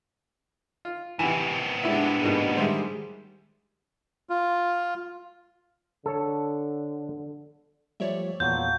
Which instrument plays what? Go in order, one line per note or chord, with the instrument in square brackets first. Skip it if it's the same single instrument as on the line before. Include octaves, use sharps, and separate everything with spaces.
[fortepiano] F4
[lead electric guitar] A2 B3 [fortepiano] C3 E3
[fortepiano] G3 E4 E5 [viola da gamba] G#3 D4
[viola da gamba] G#2 [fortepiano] B2 G3 A#3
[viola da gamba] D#3 G3 G#3 [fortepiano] C5 E5
[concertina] F4
[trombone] D3 [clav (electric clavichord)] A4 C#5
[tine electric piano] F3 G3 A3 [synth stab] C#5 D5 E5
[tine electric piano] E2 A#2 [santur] F3 F#3 F4 [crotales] G6